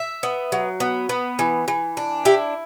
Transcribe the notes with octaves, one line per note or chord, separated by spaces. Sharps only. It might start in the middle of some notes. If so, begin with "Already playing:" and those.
Already playing: E5
B3
F#3
B3
B3
E3
E3
D4
E4 G4